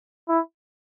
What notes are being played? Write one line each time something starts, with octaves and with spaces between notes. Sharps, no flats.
E4